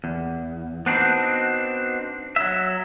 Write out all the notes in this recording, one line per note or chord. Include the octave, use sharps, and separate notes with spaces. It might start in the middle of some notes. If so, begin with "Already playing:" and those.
E2
B3 C4 D4 D#4 F#4
F#3 E5